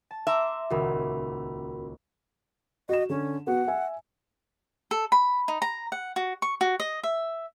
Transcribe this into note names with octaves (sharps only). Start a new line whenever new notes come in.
A5
E5 A#5 C6 D6
D#1 C#2 C#3 F#4 A#4 B5
F#4 D#5 E7
D3 C#4
B3 F#4 F#5
E5 G#5
A4
B5
D#4
A#5
F#5
F#4
C#6
F#4
D#5
E5